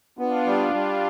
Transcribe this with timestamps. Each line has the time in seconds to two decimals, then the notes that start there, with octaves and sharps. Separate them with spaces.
0.18 B3 D4 F4
0.46 G3
0.73 G3